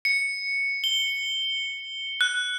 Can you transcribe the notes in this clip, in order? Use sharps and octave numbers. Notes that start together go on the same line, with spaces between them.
C#7
G7
F#6